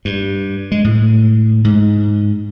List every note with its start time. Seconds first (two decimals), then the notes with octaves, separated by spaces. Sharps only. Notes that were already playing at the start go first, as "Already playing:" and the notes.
0.05 G2
0.72 G#3
0.84 A2
1.64 G#2